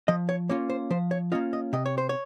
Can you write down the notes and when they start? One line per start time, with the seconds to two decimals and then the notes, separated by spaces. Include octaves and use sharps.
0.08 F3 D#5
0.29 C#5
0.49 A#3 C#4 F4 C#5
0.70 C5
0.91 F3 C5
1.11 C#5
1.32 A#3 C#4 F4 D#5
1.53 D#5
1.73 C3 D#5
1.86 C#5
1.98 C5
2.09 C#5